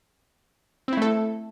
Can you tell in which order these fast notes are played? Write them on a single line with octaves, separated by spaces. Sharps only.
C4 E4 A3 A4